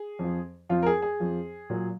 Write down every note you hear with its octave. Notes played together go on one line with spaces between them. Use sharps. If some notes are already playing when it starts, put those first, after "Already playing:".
Already playing: G#4
F2 F3
F2 F3 F4
A#4
G#4
G#4
F2 F3
A#2 F#3